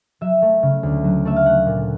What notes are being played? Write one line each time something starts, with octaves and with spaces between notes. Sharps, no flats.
F#3 E5
A3
C#3
D2
F#3
A3 E5
F5
A3 F#5
A#2